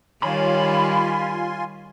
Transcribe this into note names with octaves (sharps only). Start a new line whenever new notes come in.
D#3 G3 F4 C#5 G#5 B5 C6